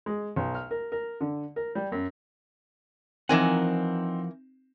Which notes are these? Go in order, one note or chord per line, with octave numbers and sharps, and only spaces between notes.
G#3
B1
F6
A#4
A#4
D3
A#4
G3
F#2
E3 F3 C4 D#4 A#4 F#5 G#5 E7